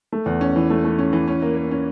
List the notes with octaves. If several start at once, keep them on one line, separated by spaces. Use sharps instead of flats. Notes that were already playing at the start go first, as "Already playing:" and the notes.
A3
E2
C#4
E3
A3
A3
C#4
E3
C#4
A#3
A#3
C#4